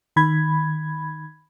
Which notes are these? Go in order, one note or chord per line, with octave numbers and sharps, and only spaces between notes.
D#3 B5 G#6